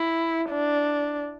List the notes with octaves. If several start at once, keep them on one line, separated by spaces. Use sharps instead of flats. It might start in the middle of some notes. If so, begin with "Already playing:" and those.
Already playing: E4
D4